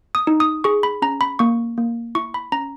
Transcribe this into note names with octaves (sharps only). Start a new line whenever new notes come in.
D#6
D#4
D#6
G#4 C#6
B5
C#4 A#5
B5
A#3 C#6
A#3
E4 C#6
B5
C#4 A#5